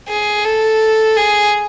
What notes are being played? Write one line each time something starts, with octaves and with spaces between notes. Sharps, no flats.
G#4
A4
G#4